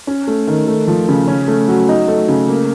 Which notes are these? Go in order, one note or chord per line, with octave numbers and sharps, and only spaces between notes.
C#4
A3
D#3
A3
F3
C#3
C#4
A3
F#3
D#4
A3
C#3
A#3